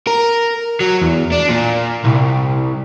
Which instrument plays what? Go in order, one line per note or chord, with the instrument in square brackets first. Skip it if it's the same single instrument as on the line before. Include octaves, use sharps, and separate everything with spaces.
[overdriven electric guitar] A#4
F#3
E2
D4
A#2
C2